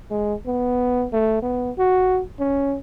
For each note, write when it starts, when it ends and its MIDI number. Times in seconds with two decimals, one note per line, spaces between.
0.10 0.34 56
0.46 1.07 59
1.13 1.39 57
1.42 1.71 59
1.78 2.22 66
2.40 2.77 61